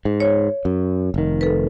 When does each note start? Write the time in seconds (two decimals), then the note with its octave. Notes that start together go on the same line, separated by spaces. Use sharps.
0.05 G#2
0.20 C#5
0.65 F#2
1.14 F1 D#3
1.41 A4 B4